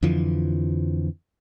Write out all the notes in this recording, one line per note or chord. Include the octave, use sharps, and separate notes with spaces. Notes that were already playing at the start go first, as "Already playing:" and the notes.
F2 D3 E3 F3